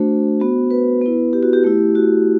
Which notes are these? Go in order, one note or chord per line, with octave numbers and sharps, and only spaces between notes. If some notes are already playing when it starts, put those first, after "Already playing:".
Already playing: A3 D4 F#4 C5
B3 F#4
B4
B3 E4
G4
F#4
G4
A3 E4 G4
F#4